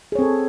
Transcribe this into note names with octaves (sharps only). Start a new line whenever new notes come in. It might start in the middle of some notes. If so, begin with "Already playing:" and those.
C4 G#4 A4 C#5